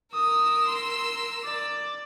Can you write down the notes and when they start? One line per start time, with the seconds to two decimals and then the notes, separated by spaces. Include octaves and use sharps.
0.14 A#4 D#6 E6
0.67 C6
1.45 D5